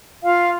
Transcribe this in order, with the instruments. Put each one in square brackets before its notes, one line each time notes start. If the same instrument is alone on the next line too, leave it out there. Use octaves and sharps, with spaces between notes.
[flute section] F4 F5